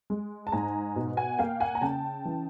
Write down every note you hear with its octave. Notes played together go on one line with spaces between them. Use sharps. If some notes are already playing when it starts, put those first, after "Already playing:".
G#3
A5
G#2 G#5 A#5
B2
F#5 G#5
A#3 F5 G5
F#5 G#5
A#5
C#3 G5 A5
E3